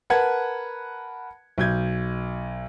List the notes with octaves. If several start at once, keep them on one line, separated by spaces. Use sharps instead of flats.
A#4 B4 F#5 A5 G#6
B1 G6 G#6